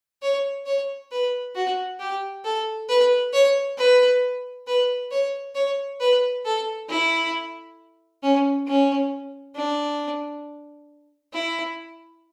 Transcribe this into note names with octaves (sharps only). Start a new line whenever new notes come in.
C#5
C#5
B4
F#4
G4
A4
B4
C#5
B4
B4
C#5
C#5
B4
A4
E4
C#4
C#4
D4
E4